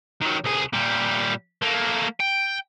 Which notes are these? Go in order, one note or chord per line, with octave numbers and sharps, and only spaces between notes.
D#3 F#3
C2 G#4
A#2 G3
A3 A#3
G5